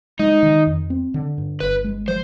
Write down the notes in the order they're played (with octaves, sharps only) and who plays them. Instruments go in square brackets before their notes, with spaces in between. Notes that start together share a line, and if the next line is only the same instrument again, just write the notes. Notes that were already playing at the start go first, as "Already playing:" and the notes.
[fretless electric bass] G#3 [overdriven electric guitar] D#4
[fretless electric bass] D#3
F2
C4
D3
G2
[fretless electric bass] G1 [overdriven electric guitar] B4
[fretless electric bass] G#3
[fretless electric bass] F3 [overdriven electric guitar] C5